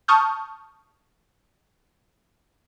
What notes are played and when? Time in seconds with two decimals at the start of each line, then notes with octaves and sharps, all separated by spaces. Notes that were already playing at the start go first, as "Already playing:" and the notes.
0.08 A5 C#6 D#6 F6 G6